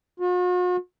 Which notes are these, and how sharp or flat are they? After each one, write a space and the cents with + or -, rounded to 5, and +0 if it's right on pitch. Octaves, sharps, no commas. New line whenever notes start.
F#4 -45